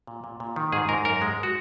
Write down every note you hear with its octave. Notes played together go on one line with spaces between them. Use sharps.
A#2
A#2
A#2
D#3
G#2 G#4
G#2 A#4
F#2 A#4
G#3
F#4